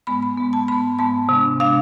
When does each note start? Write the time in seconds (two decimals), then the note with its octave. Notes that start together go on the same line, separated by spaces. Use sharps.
0.07 G#2 G#3 B3 B5
0.22 B5
0.38 G#2 G#3 B3
0.53 A5
0.68 G#2 G#3 B3 B5
0.99 G#2 G#3 B3 A5
1.29 C3 G#3 D4
1.60 C3 G#3 D4 F5